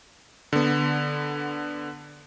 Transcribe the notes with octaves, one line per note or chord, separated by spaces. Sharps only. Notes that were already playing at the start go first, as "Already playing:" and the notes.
D3 B3